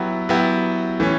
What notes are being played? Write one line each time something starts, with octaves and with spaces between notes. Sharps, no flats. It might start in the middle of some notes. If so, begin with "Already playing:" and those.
Already playing: F#3 B3 E4 G4
F#3 B3 E4 G4
E3 A3 C#4